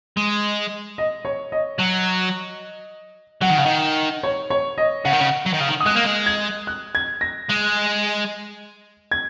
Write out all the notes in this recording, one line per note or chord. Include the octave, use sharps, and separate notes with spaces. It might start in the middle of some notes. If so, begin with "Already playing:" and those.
G#3
D#5
C#5
D#5
F#3
F#3 F#5
D#3
C#3
D#3
C#5
C#5
D#5
C#3 F#5
D#3
C#3
F#3
D#3
C#3
D#3
D#6
G#3 F#6
A#3
G#3
G#6
F#6
G#6
A#6
G#3
G#6